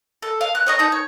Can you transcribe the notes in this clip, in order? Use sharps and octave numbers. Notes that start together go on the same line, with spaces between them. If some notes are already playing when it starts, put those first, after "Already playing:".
A4
F5
F#6
C#5 D#5 A#5
D#4 A5 G6
C#5